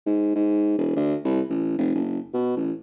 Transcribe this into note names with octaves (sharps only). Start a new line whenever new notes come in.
G#2
G#2
E1
D2
C2
A1
F1
F#1
B2
A1